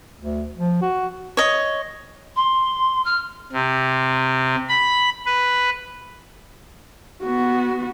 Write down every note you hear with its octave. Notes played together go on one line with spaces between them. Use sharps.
D2
F3
F#4
C#5 D#5
C6
F6
C3
B5
B4
B3 F#4